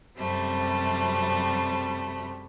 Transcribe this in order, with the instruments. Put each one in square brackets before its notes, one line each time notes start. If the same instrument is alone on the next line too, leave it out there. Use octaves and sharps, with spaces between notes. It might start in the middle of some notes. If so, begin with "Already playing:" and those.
[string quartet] F#2 C3 F#3 G3 A3 C4